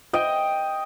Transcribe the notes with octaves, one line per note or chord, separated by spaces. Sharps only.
D#5 G5